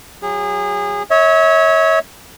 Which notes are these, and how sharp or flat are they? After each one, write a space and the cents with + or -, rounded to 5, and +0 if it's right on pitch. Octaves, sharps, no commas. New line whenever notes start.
F#3 +0 G#4 -30
C#5 +0 E5 -40